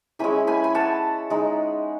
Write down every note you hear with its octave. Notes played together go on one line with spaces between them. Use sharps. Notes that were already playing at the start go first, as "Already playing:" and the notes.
G#3 C#4 E4 G#5 B5
G#5 B5
B5
F#5 A5
G#3 D#4